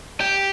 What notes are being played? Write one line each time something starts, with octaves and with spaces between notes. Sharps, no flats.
G4